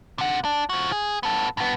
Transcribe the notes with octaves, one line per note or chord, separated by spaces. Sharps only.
C3 F#5
D4
F3 F#4
G#4
B3 A4
G2 B3